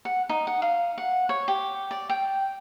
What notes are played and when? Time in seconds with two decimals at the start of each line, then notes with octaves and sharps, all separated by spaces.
0.05 F#5
0.29 D#4
0.47 F#5
0.62 F5
0.98 F#5
1.29 C#5
1.48 G4
1.91 D5
2.10 G5